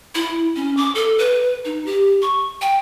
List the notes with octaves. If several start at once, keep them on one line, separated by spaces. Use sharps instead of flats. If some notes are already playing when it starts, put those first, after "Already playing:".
E4
C#4
D6
A4
B4
D#4
G4
C#6
G5